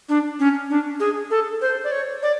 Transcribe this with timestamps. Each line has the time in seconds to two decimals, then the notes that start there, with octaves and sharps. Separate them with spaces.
0.09 D4
0.39 C#4
0.70 D4
1.00 G#4
1.31 A4
1.61 C5
1.84 D5
1.92 C#5
2.23 D5